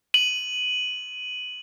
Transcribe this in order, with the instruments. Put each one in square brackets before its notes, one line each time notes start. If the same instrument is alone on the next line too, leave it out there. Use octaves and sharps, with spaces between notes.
[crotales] D#7 F#7